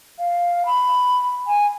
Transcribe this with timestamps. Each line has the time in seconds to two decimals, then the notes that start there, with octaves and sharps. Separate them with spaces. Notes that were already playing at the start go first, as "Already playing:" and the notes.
0.19 F5
0.66 B5
1.47 G#5